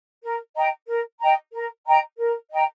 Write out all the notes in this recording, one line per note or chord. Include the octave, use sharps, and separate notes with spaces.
A#4
D#5 G5 A#5
A#4
D#5 G5 A#5
A#4
D#5 G5 A#5
A#4
D#5 G5 A#5